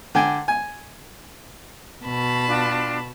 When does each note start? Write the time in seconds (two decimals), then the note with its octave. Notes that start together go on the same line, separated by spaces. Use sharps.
0.15 D3 G5 G#5
0.48 G#5
2.05 B2 A5 B5
2.48 D4 F4 G5